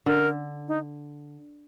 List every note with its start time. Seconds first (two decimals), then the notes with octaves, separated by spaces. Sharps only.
0.06 D3 A#4
0.68 D#4